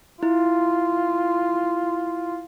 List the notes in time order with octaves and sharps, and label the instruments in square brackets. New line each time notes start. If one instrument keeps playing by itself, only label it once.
[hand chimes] E4 [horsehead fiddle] F4